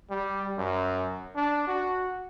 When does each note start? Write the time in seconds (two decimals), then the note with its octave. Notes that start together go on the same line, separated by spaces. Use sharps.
0.10 G3
0.58 F#2
1.36 D4
1.68 F#4